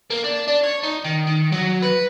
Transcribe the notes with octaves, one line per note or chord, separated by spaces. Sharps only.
A#3
D4
D4
C#5
D#4
D#3
D#3
F#3
B4